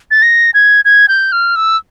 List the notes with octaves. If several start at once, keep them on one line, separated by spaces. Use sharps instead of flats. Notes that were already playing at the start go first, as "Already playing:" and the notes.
A6
A#6
G#6
G#6
G6
F6
E6